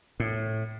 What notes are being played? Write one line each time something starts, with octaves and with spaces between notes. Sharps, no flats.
A2